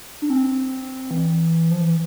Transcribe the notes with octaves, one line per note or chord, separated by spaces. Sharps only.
D4
C4
E3
F3
E3